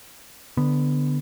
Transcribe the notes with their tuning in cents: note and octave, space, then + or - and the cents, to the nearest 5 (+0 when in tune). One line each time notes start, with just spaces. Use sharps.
D3 +0 B3 +0